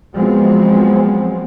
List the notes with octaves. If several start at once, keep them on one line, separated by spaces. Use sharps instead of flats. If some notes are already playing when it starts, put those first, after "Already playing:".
F3 F#3 G#3 B3 C4